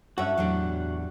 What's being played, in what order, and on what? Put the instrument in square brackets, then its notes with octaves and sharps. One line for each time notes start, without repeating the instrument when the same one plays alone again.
[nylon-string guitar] G2 A4 [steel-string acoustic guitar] C#4 E5 [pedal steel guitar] F#4 F#5
[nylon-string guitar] E2 A2 F#3 [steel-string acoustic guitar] G3 D4